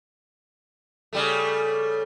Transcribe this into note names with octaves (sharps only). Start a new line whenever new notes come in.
C#3 G3 A3